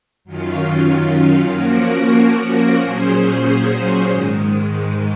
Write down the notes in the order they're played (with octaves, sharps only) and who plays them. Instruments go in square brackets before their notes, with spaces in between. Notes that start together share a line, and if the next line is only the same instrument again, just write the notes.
[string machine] F#2 D#3 F#3 C#4 F4
F3 A#3 C#4 F#4 A#4
A#2 F#3 C#4 G#4 C5
G#2 D#3 G#3